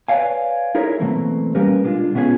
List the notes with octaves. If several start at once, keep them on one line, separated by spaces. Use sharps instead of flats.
B4 C#5 D5 F5 G#5
D#4 E4 G#4 A#4 C#5
B2 E3 F#3 A3 A#3 C4
G3 A#3 C#4 G4 A#4 B4
B2 G#3 D4 F4
B2 B3 C#4 F4 G#4